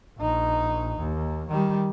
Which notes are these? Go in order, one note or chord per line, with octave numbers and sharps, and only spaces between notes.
A#1 D#4
D#2
D#3 G3